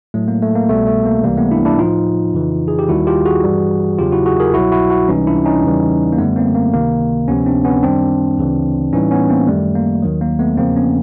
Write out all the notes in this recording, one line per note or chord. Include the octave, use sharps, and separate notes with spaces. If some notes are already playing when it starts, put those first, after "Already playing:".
A2 F#3 A3
A#3
A3
A#3
C2 B2 G3 A3 B3
A3
A#3
C#2 C3 E3 G3 A#3
A3 B3
D4 E4
D4 E4
A2 F3 D#4 F4
F2 C#3 E3
G#4
G4
D#2 D#3 G3 E4 F#4
F4 G4
F#4 G#4
G2 E3 G3
E2 C#3 F#3 F4 G4
E4 F#4
F#4 G#4
G#4 A#4
C2 B2 F#3 E4 F#4
E4 F#4
E4 F#4
C#2 C3 E3 G3 C#4 D#4
D4 E4
C#4 D#4
E2 C#3 E3 G3
A#3
F#2 D3 G3 A3 B3
A#3 C4
A#3
C#2 C3 D#3 A#3
D2 C3 F3 B3 C#4
C4 D4
B3 C#4
F#2 D#3 G3 C4 D4
D2 C#3 E3
A2 E3 G3 C#4 D#4
B3 C#4
A#3 C4
F#2 D#3 G3 A3
A#3
D#2 D#3 F#3
A#3
A3 B3
E2 C#3 F3 A#3 C4
B3 C#4